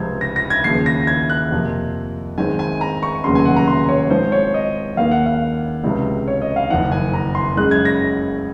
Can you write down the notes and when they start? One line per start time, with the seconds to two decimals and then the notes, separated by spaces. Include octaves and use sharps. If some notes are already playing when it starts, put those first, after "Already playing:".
Already playing: C#2 C3 F3 C4 G#6
0.21 A#6
0.36 A#6
0.50 G#6
0.64 D#2 C#3 F3 C7
0.86 A#6
1.07 G#6
1.30 F#6
1.51 F2 C3 F3 A#3
2.38 G#2 D#3 G#3 C4 G#5
2.59 G#5
2.81 A#5
3.03 C#6
3.24 F1 D#2 C#3 F#3 C#4 C6
3.35 G#5
3.45 F#5
3.56 A#5
3.67 C6
3.89 C#5
4.10 G#2 F3 C4 C5
4.32 C#5
4.54 D#5
4.97 D#2 D#3 A#3 F5
5.11 F#5
5.26 F5
5.84 C#2 C3 F3 G#3 C#4
6.28 C#5
6.42 D#5
6.56 F5
6.70 F#1 F2 D#3 F#5
6.92 G#5
7.13 A#5
7.35 C6
7.57 F#2 C#3 G#3 F#6
7.71 G#6
7.85 A#6